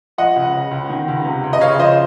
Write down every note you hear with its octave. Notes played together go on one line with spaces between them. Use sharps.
F3 D#5 F#5
C#2
C#3
C#2
D#3
C#2
C3
C#2
D#5
C#3 C#5 F5
F3 C5 D#5